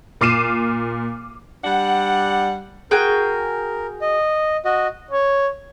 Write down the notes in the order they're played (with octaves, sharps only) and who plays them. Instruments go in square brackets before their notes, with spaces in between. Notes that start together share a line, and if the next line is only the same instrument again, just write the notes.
[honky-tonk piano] A#2 D6 F6 C7 D#7 E7
[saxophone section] G3 D4 F#5
[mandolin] F#4 G#4 G5 [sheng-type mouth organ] A#4
[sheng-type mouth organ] D#5
F#4 D#5
[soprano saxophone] C#5